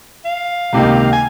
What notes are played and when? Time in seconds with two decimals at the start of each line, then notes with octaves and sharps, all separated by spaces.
0.25 F5
0.73 C#2 C3 D#3 A#3 D#4
1.12 G#5